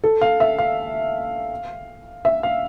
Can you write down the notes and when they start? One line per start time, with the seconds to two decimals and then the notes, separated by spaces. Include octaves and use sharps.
0.04 A4
0.21 F5
0.40 E5
0.59 F5
2.25 E5
2.43 F5